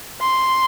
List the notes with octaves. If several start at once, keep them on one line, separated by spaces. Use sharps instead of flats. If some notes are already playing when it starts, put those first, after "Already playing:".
C6